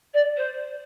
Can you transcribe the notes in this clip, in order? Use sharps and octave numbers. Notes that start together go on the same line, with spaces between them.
D5
C5